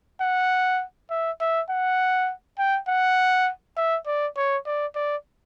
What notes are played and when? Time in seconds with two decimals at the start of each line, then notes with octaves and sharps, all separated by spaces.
0.21 F#5
1.11 E5
1.40 E5
1.70 F#5
2.59 G5
2.88 F#5
3.77 E5
4.06 D5
4.37 C#5
4.66 D5
4.95 D5